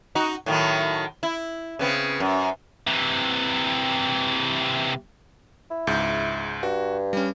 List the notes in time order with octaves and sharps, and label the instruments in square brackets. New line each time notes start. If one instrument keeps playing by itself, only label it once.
[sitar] D#4 F#4
A2 D#3 F#3
E4
C#3 B3 C4
F#2
[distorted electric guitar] C3 E3
[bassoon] E4
[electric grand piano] C#2 G#2 G6
[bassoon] G2 [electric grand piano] F#4
[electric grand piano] G3 C#4